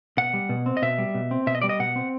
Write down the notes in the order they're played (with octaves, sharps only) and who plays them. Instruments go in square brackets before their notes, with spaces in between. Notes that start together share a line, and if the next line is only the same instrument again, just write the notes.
[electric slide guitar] B2 F#5
G3
B2
C4
D#5
B2 E5
G3
B2
C4
B2 E5
D#5
G3 D5
D#5
B2 F#5
C4